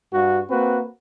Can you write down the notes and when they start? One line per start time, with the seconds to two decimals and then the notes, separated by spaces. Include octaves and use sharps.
0.13 G2 F#4
0.50 A#3 C4 F#4 B4